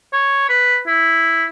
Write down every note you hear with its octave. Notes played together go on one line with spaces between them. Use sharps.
C#5
B4
E4